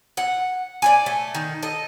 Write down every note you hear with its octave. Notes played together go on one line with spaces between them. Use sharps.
F#5
D5 G5 G#5
A3
D#3
A4 D#5